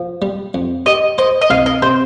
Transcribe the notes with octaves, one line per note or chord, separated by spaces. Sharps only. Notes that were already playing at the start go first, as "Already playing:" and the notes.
Already playing: F3
G3
F2
G4 D#5
C5 D#5
D#5
C2 F5
D#5
C3 C5